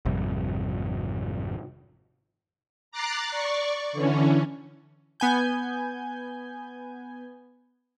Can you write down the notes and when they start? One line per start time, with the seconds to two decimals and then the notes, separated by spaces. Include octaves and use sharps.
0.05 G#1 F2 C3 G3
2.92 A#5 D6 F#6 A6 C7
3.31 D5 C#6
3.93 D3 E3 C#4
5.20 B3 G#5 G6